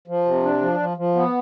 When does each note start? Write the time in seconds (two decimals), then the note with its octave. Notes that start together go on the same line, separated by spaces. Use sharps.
0.08 F3
0.25 C3
0.43 D4
0.61 F3
0.79 F3
0.97 F3
1.15 B3